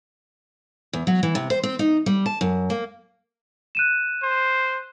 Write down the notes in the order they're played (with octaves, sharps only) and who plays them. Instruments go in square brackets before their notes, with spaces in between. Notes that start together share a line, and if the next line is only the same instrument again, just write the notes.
[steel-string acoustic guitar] E2
F#3
E3
C3
C5
C4
D#4
G3
A5
F#2
A#3
[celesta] F#6 D#7 E7
[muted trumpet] C5